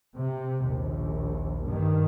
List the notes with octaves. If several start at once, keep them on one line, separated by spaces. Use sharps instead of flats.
C3
A#1 D#2
G2 D#3